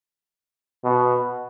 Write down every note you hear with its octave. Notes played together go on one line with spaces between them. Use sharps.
B2